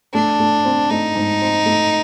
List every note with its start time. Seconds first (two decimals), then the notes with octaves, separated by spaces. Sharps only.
0.14 A3 D4
0.40 A3
0.65 C4
0.90 A3 D#4
1.16 G#2
1.42 C4
1.66 A3